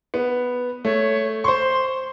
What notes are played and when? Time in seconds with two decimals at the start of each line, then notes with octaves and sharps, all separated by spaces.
0.14 B3
0.85 A3 C#5
1.44 C5 C6 C#6